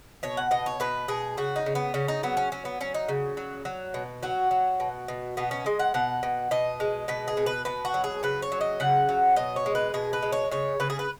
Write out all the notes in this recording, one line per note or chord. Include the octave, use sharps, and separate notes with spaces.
B2 C#5
F#5
B2 D#5
C#5
B2 B4
B2 G#4
C#3 F#4
D#4
C#3
B3
C#3 C#4
D#4
F#3 B3
C#4
F#3 C#4
B3
F#3 C#4
D#4
C#3
F#3
F#3
B2
F#3 F#4
F#3
B2
B2
B2 B3
C#4
G#3 D#5
F#5
B2 F#5
B2
B2 D#5
G#3
B2 B4
G#4
B2
B4
B2 B4
F#4
F#3
G#4
C#3 B4
C#5
F#3
D#5
C#3 F#5
F#3
B2 D#5
C#5
G#3
B4
B2 G#4
B4
G#3
C#5
C#3 C#5
C#3 B4
G#4
B4